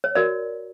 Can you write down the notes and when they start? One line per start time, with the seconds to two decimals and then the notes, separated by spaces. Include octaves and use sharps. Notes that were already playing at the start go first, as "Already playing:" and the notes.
0.04 C#5
0.15 F#4 A#4 C#5 D5